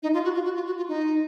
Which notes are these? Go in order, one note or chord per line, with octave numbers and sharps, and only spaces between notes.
D#4
F4
F#4
F4
F#4
F4
F#4
F4
D#4